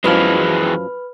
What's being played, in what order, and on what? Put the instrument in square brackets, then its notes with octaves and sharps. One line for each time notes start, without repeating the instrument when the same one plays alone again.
[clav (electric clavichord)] F#2 F3 [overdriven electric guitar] E3 G#3 [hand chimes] B4 B5 F6